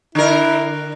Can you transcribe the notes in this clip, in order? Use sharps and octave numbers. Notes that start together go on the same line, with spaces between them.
D3 E4 A#4